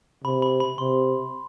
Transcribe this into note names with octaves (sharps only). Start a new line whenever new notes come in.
C3 B5
B5
B5
C3 C6